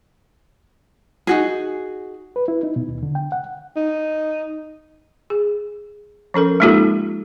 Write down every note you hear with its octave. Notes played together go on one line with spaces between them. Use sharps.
D#4 F#4 G#4
B4
E4
D#4
B2
D#2
D3
G5
F#5
D#4
G#4
F3 C#4 A4 A#4
G#3 A#3 D#4 F4 G4 A4